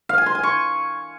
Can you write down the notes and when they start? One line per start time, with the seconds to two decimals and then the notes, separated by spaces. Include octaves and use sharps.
0.09 F5
0.18 G#5
0.26 C6
0.35 G#5
0.43 C#6